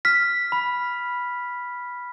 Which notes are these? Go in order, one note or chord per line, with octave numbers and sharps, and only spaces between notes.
F6 B6
B5